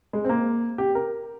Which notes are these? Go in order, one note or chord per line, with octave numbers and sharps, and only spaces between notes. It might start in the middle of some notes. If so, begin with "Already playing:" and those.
G#3
C4
A#3
G4
A#4